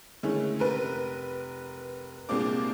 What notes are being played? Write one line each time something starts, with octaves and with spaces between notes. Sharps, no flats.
D3 D#3 G#3 A3 C#4 E4
F1 A#4 B4
C2 A#2 G#3 C4 D4 D6